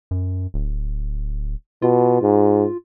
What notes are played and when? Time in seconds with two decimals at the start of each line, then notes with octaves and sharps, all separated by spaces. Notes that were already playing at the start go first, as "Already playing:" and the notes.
0.11 F#2
0.54 D1
1.82 B2 F4
2.21 G#2